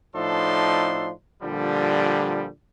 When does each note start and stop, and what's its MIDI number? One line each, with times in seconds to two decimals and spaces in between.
0.16 1.12 45
0.16 1.12 53
0.16 1.12 62
0.16 1.12 63
0.16 1.12 69
0.16 1.12 84
1.43 2.49 46
1.43 2.49 50
1.43 2.49 53
1.43 2.49 55